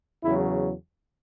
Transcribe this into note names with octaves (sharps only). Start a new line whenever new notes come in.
E2 C#3 F#3 E4